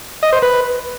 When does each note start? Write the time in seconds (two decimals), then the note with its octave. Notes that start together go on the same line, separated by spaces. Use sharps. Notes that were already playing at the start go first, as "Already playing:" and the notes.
0.23 D#5
0.33 C5
0.42 B4